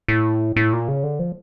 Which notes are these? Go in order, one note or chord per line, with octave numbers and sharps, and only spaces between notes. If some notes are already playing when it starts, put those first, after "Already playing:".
A2
A2
A#2
C#3
D3
F3